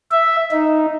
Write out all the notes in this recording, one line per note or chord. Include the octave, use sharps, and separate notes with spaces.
E5
D#4